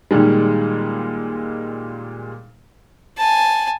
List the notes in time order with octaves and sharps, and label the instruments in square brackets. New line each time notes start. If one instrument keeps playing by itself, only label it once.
[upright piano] A#2 D#3 G3 G#3
[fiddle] G#5 A5